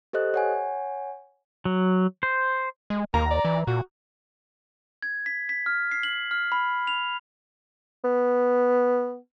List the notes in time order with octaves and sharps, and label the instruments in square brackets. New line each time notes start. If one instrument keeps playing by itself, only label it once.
[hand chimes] G4 A4 C5 D#5 F#6
C#5 F#5 G#5
[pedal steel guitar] F#3
C5
[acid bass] G#3
[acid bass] D#2 [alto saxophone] A#3 [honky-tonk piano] A#5
[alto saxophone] D5
[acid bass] E3
[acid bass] A#2 [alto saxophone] F#4
[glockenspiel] G#6
B6
B6
F6
C7
F#7
F6
B5
F7
[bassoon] B3